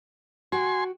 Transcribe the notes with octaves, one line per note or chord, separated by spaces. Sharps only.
F#4 G5 G#5 C6